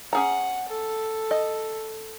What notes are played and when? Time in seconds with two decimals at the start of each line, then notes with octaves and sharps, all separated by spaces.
0.13 C#4 G#4 F#5 A#5
0.68 A4
1.31 D#5